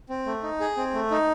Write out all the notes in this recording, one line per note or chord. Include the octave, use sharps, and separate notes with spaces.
C4
A3
D#4
G#4
C4
A3
D#4